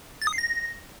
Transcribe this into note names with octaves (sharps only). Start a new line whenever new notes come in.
A6
D#6
C7
A#6